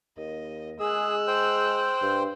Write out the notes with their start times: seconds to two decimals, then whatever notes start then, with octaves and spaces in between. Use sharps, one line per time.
0.18 D#2 D#5
0.80 G#3 G#4 E6 F#6
1.27 C5 G5
2.02 G2